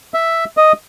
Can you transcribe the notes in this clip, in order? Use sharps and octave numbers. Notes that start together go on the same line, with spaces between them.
E5
D#5